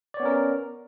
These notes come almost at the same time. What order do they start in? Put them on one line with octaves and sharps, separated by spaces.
D5 C#5 B3 C#4 A#4